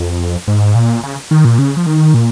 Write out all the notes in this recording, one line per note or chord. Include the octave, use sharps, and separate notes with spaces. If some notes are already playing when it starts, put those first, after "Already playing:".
Already playing: F2
G#2
A#2
C#3
D#3
A#2
C#3
F3
D#3
A#2